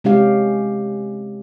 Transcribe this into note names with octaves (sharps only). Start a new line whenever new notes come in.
C3 G#3 C#4 G4 F5